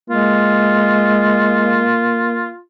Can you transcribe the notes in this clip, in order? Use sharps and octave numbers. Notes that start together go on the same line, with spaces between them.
G#3 A#3 F4